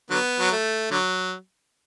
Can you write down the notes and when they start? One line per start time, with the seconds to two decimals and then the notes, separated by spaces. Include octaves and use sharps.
0.10 D3 F#3 B3
0.40 F#3
0.51 A3
0.91 D3 F#3